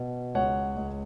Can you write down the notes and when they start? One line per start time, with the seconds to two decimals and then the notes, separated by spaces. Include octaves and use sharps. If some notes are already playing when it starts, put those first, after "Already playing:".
Already playing: B2
0.34 C#2 C#5 F#5
0.76 C#2